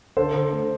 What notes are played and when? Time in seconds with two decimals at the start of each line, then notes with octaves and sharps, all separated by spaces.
0.17 D3 A4 C5
0.35 D3
0.53 A3